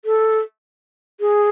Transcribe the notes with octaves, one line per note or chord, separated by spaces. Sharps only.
A4
G#4